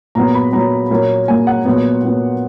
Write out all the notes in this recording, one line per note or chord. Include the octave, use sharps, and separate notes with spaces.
A#2 F#3 B3 A#5
B5
A#2 F#3 B3 A#5
A#2 F#3 A#3 C#4
A#2 F#3 A#3 C#4 G#5
F#5
A#2 F#3 B3
A#2 F#3 B3